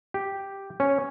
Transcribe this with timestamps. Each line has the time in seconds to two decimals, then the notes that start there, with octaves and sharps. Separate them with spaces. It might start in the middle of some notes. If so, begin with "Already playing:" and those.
0.14 G4
0.80 C#4